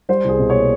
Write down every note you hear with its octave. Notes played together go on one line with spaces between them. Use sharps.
G3 C5
C2 G#4
B2
A#3 C#5